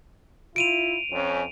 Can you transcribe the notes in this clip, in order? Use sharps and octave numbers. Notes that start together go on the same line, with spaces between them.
E4 F4 D7 D#7 F7
F2 C#4